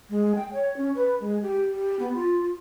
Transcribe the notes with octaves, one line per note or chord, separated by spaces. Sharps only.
G#3
G5
C#5
C#4
B4
G#3
G4
G4
B3
F4